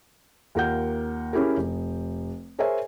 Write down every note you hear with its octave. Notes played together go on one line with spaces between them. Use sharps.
D#2 F4 A#4 F#5 G6
C#4 E4 G4 G#4 A#4
F1
G#4 A#4 C5 C#5 E5 G#5